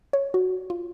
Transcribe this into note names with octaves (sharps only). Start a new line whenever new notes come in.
C#5
F#4
F4